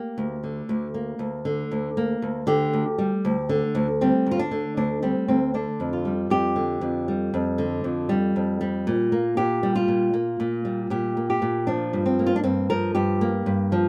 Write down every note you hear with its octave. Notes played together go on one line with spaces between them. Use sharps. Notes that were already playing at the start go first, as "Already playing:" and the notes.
Already playing: A#3 G4
D2
D3
D2
A#3
D2
D3
D2
A#3
D2
D3 G4
D2
G3
D2
D3
D2
G3 C4
D2 F4
D4
D3
D2 D4
G3 C4
D2 C4
D3 D4
F2
F4
G3
F2 G4
D3
F2
G3
F2
D3
F2
G3
F2
G3
A#2
A#3
A#2 G4
G3
F4
A#2
A#3
A#2
G3
A#2 G4
A#3
G4
A#2
F3 D4
G2
C4
A#3
F4
D4
G2 C4
F3 A#4
G2 G4
A#3
G2
F3